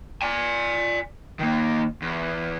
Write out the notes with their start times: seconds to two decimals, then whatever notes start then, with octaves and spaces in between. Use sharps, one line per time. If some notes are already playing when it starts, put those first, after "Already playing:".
0.22 D5 G#5
1.39 D#3 A#3
2.02 E2